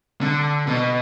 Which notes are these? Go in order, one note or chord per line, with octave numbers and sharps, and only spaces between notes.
D3
B2